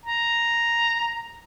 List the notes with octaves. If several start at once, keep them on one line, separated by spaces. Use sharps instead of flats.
A#5